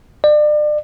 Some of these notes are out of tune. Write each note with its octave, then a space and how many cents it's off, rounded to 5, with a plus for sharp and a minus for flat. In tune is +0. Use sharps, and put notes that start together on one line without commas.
D5 +35